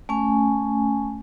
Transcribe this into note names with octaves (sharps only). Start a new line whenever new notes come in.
A3 C#4 G#5